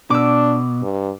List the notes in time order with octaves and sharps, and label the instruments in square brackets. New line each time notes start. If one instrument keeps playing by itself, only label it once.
[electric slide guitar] B2 [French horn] D4 [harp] D6 E6
[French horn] G2